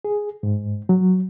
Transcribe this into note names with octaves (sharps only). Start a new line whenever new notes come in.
G#4
G#2
F#3